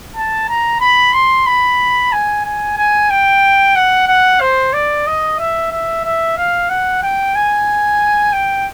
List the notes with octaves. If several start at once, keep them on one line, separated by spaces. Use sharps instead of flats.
A5
A#5
B5
C6
B5
G#5
G#5
G#5
G5
F#5
F#5
C5
D5
D#5
E5
E5
E5
F5
F#5
G5
G#5
G5